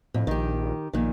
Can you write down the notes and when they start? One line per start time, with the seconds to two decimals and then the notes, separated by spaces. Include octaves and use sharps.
0.14 F2 A2
0.27 A#1 D#3 G4
0.93 A#1 A#2 D#3